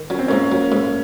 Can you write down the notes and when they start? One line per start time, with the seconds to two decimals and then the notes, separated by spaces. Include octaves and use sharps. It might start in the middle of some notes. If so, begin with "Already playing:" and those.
Already playing: D#3
0.10 F#3 C#4
0.19 C4
0.28 G#2 A#3 C#4
0.52 F#3
0.72 G#2